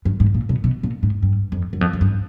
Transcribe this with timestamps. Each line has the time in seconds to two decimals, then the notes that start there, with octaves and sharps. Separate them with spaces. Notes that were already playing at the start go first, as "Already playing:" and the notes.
0.05 G2
0.20 G#2
0.34 A#2
0.49 B2
0.64 B2
0.83 A#2
1.03 G#2
1.23 G2
1.52 F2
1.73 F#2
1.81 F2
1.93 F#2
2.01 G2